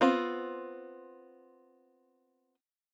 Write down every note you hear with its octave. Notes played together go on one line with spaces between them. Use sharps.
B3 C4 F4